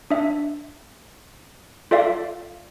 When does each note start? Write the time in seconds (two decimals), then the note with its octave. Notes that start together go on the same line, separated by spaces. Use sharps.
0.11 D4 E5
1.91 F4 A4 D5 E5 F5